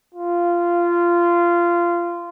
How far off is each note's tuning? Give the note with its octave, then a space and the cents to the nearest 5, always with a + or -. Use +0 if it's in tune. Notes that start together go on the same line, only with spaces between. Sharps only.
F4 -15